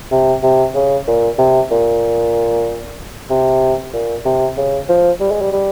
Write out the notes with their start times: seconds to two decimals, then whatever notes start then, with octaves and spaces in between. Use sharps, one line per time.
0.11 C3
0.43 C3
0.75 C#3
1.07 A#2
1.38 C3
1.71 A#2
3.30 C3
3.93 A#2
4.25 C3
4.57 C#3
4.89 F3
5.20 G3
5.31 G#3
5.41 G3
5.52 G3